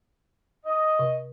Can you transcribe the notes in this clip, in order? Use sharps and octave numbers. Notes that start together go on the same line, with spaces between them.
D#5
C3